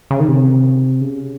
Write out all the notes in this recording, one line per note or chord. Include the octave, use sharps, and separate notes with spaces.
C#3
D#3
C3
C#3